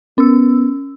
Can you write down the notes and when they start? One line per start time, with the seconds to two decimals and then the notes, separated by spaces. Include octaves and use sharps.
0.18 B3 C#4 E6